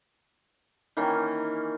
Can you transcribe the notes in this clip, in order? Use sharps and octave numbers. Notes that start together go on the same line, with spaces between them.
D#3 E3 A#3 C#4